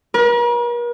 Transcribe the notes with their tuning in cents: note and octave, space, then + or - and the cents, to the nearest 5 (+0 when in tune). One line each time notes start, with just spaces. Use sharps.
A#4 +45